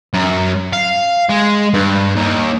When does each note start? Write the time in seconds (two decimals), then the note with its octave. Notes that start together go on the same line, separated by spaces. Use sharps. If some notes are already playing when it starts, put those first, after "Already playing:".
0.14 F#2
0.73 F5
1.29 G#3
1.74 G2
2.15 D#2